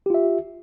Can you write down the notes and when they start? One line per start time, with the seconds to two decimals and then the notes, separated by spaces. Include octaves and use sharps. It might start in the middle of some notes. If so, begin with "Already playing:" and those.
0.06 G4
0.10 F4
0.14 E5